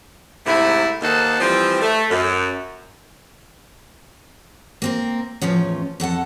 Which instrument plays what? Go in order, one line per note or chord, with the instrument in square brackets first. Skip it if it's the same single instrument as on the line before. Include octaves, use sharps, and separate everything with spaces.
[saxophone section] G#2 C3 A3 E4
D#2 A#3 D#4 A4 C5 F#5
E3 F3 G3 C4
A3
F#2
[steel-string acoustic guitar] A#3 C4 A#4
E2 A2 F3 C#4
F2 A4 F#5 A5